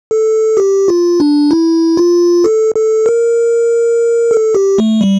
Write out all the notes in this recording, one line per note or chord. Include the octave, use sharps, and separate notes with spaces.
A4
G4
F4
D4
E4
F4
A4
A4
A#4
A4
G4
A3
G3